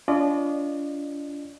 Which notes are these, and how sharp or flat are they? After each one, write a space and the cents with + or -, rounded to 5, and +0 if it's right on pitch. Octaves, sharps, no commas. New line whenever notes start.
D4 -40 F4 -25 D#5 -45